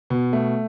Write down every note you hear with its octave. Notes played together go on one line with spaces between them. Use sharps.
B2
A3